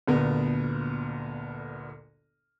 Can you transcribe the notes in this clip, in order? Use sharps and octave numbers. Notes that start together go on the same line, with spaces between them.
G1 D2 A#2 B3 A#4